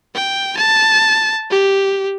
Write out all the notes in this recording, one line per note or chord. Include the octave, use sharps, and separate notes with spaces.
G5
A5
G4